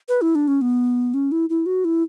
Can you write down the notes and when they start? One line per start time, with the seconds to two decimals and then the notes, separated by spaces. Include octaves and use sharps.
0.08 B4
0.21 E4
0.35 D4
0.48 C#4
0.61 B3
1.14 C#4
1.32 E4
1.49 E4
1.66 F#4
1.84 E4